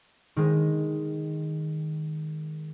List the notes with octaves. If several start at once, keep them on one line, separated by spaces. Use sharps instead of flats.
D#3 G#3